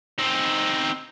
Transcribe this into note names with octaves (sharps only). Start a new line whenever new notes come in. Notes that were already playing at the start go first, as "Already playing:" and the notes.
C4 D#4